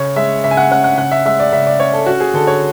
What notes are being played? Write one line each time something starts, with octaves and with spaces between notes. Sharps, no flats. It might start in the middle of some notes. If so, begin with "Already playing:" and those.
Already playing: C#3 C#5
G#3 E5
C#3 E5
G#5
F#5
C#4 F#5
F#5
C#3 F#5
E5
G#3 E5
D5
C#3 E5
D5
C#4 C#5
A4
C#4 F#4
G#4
D3 A4
C#5